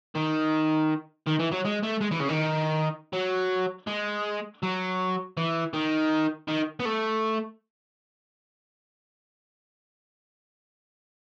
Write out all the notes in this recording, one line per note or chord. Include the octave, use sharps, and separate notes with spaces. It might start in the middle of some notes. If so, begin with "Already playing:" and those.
D#3
D#3
E3
F#3
G#3
A3
G#3
E3
C#3
D#3
F#3
G#3
F#3
E3
D#3
D#3
B3
A3